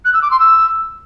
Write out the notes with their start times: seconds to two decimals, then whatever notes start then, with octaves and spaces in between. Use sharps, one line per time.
0.05 F#6
0.14 E6
0.22 D6
0.31 C6
0.40 E6